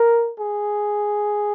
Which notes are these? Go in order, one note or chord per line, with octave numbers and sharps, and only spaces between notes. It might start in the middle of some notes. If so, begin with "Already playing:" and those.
Already playing: A#4
G#4